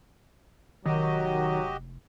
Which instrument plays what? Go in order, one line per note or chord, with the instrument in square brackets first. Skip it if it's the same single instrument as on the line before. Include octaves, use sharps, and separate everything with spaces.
[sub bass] F1 [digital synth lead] D#3 [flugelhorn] F#3 [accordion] F#4 G4 D#5